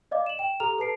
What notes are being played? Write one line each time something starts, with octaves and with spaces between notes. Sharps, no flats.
D5 D#5 F5 D6
E7 F#7
G5 E7
G4 A4 A#5 F6 F7
A4 B4 A5 C7 D7